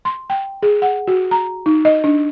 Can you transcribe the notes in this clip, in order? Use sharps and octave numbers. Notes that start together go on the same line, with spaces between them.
C6
G5
G#4
F#5
F#4
A#5
D#4
D#5
D4